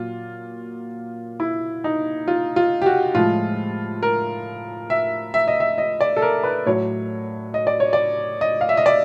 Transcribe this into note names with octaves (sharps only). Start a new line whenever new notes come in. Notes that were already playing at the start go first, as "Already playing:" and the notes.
Already playing: A#2 F#3 F4
E4
D#4
F4
F4
G4
F#4
A2 F3 G#3 F4
A#4
E5
E5
D#5
E5
D#5
D5
A4
A#4
B4
A2 F#3 C#5
D#5
D5
C#5
D5
D#5
F5
E5
D#5
D5